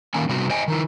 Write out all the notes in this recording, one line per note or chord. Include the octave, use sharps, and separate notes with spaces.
D#3 A#3 C#4 G#5
C3 G3 B3 C4 F#4
C5 D#5 G5 G#5
D#3 D#4 E4